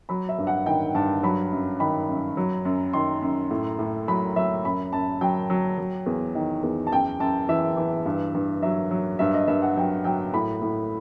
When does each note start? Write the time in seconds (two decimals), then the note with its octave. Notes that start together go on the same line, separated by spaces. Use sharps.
0.09 F#3 B5
0.29 E5
0.38 G2
0.47 F#5
0.66 D#3 G5
0.94 G2 A5
1.23 F#3 B5
1.52 F#2
1.80 D#3 B5
2.09 F#2
2.37 F#3
2.65 F#2
2.93 D#3 C6
3.22 F#2
3.51 A2
3.79 A2
4.08 F#3 B5
4.36 F#3 E5
4.65 F#2 B5
4.93 F#2 A5
5.21 F#3 G5
5.50 F#3
5.78 F#3
6.06 E2
6.35 D#3
6.63 E2
6.87 A5
6.91 F#2 G5
7.20 F#2 A5
7.49 E3 E5
7.77 E3
8.06 G2
8.35 G2
8.62 F#3 E5
8.91 F#3
9.19 G2 E5
9.34 D#5
9.48 G2 E5
9.62 F#5
9.76 F#3 G5
10.04 F#3 G5
10.34 A2 B5
10.62 A2